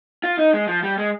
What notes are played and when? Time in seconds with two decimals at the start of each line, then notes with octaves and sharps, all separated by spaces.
0.24 F4
0.39 D#4
0.54 G#3
0.68 F3
0.83 G3
0.98 G#3